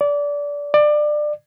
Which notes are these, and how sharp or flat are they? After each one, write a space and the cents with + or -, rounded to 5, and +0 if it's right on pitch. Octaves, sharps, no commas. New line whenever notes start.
D5 -20
D5 +25